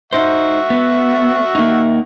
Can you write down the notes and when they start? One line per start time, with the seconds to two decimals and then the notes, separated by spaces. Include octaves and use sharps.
0.13 D#4 C5 E5 F#5 C#6
0.70 B3
1.55 A#3 D#4